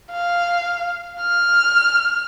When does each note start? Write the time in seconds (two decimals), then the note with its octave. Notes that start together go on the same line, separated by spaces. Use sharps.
0.11 F5
1.20 F6